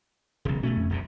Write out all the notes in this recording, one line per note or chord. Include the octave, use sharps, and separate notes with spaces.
E1 B1 C#3
G1 B2 A3 C#4
F2
D#1 C2 C3